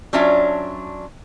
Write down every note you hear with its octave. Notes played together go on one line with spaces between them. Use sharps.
F#3 C#4 D4 F4 E5